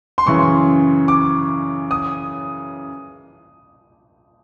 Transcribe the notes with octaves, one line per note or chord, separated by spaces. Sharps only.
C6
F#2 C#3 E3 C#6
D6
D#6